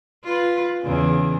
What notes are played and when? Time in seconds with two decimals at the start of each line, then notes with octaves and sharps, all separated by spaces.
0.24 F4 B4
0.82 E2 C#3